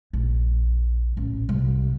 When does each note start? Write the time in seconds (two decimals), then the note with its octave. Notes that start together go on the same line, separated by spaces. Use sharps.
0.13 A#1
1.17 A1
1.49 C2